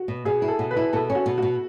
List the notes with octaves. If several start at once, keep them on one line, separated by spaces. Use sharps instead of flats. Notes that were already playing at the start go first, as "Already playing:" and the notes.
Already playing: F#4
B2
B2 G#4
E4
A4
B2
B4
E4
B2 A4
C#4
F#4
B2
F#4
B2